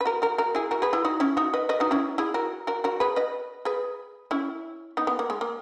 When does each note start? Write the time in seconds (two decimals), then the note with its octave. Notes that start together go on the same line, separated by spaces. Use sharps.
0.01 B4
0.05 F#4 A#4
0.22 F#4 A#4
0.38 F#4 A#4
0.55 E4 G#4
0.71 F#4 A#4
0.82 G#4 B4
0.93 E4 G#4
1.05 D#4 F#4
1.20 C#4 E4
1.37 D#4 F#4
1.54 B4 D#5
1.69 B4 D#5
1.80 D#4 F#4
1.91 C#4 E4
2.18 E4 G#4
2.34 F#4 A#4
2.67 F#4 A#4
2.84 F#4 A#4
3.00 G#4 B4
3.16 B4 D#5
3.65 G#4 B4
4.31 C#4 E4
4.97 B3 D#4
5.07 B3
5.19 A#3
5.30 G#3
5.41 A#3